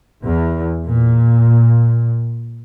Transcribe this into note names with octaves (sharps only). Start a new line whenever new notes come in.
E2
A#2